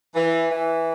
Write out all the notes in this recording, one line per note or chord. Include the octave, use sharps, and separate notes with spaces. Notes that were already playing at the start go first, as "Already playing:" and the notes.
E3
E3